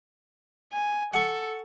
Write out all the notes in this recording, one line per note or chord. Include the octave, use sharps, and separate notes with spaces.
G#5
A4 F#5 C#6